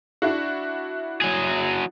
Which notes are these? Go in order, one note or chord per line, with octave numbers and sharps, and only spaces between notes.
D4 E4 F#4
F#3 G#4